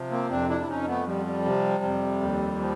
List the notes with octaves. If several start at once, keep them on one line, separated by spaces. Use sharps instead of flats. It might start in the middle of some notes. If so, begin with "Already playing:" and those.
Already playing: C3 F3
A#3 C4
F2 C4 D4
D4 E4
E4
F2 C#4 D#4
A3 B3
F3 G3
G3
C3
F2
D#2
F3